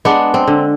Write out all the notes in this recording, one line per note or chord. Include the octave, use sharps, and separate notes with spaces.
G#3 B3 D4
C4
D3